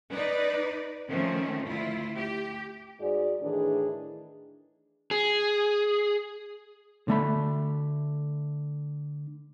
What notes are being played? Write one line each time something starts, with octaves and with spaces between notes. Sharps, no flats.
D#4 B4 D5
D#3 F3 A3 C4 C#4
D2 E4 F4
G4
G#2 G#3 F#4 G#4 D5
A2 D#3 E3 D4 G#4
G#4
D3 A3 B5